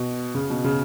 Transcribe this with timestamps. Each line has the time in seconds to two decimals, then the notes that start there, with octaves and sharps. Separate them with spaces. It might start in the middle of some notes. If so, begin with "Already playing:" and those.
Already playing: B2
0.35 C#3
0.50 B2
0.64 C#3